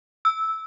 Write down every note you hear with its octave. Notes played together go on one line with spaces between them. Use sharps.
E6